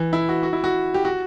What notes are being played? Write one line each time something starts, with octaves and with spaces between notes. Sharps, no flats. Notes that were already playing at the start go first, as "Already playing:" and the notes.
Already playing: E3
E4
F#4
F#4
E4
F#4
G4
F#4